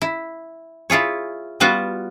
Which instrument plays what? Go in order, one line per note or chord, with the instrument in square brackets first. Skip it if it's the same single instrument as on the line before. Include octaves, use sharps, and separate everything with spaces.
[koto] E4
E4 F4 G#4 C#5
G3 B3 F4 F#4